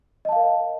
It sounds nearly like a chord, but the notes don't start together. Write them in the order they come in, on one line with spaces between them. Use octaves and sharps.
D#5 A5 F5 A#4